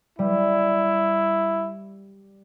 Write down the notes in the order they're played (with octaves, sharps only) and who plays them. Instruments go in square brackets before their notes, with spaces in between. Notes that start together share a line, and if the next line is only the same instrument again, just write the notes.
[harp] G3 [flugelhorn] E4